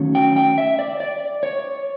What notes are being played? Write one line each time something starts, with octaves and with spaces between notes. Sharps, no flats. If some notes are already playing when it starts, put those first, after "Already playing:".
Already playing: D#3 F#3 A3 C#4
G5
G5
E5
D5
D5
C#5